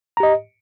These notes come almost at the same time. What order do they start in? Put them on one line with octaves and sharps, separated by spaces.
A#5 G4 D#5